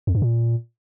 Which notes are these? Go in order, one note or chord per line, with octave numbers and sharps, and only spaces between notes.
F2
G2
A#2